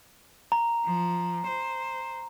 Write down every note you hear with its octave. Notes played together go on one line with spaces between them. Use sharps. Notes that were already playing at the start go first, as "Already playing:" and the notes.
A#5
F3
C5